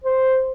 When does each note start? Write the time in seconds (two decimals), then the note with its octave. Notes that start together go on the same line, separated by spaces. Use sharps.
0.04 C5